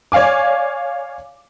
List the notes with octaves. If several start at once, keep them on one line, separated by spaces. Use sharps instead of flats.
C#5 D5 F5 G#5 D6